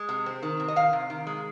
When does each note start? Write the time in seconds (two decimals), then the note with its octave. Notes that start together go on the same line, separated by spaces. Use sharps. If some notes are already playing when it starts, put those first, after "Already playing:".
Already playing: G#3
0.09 C3
0.26 C4
0.42 D#3
0.60 C3
0.68 D#5
0.76 D#3 F5
0.93 C3
1.10 D#3
1.27 G#3